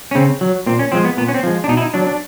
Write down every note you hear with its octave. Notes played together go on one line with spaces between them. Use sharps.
C#4
C#3 C4
F#3
A#2 C4
C#4
F3 G#3 C4
B3
A#2 B3
C#4
C4
F3 G#3
D4
B2 D#4
E4
D#4
F#3 D4
D4